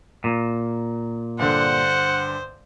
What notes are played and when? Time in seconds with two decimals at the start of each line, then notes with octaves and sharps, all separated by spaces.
0.24 A#2
1.39 G2 D3 C5 F#5